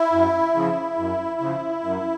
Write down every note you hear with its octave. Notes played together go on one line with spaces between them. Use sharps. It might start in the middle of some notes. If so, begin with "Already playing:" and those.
Already playing: E4
F#2
C#3 F3
F#2
C#3 F3
F#2